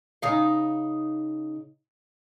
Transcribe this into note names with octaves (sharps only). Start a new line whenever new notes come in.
C#3 D#4 F5